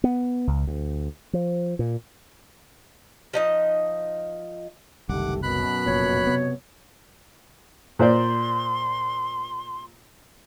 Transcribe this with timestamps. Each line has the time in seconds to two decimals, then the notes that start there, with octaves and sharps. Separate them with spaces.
0.04 B3
0.47 C#2
0.67 D2
1.33 F3
1.79 A#2
3.33 F3 D#4 D#5
5.09 F#1 C2 D#3 A3 G4 F#5 D6
5.43 F#2 B2 B5 F#6
5.86 F1 A#2 C#5
6.27 C3 B3
7.99 A#2 C5 D5 C6